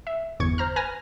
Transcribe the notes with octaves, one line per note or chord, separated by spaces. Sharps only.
E5
G1 E2 C#6 G#6
C5 A#5 F6
B4 G#5 F6 A#6